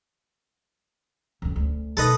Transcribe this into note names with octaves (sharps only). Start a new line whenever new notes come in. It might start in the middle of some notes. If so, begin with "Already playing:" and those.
F2 C#3
D2
B1 D#4 A4 B4 D#5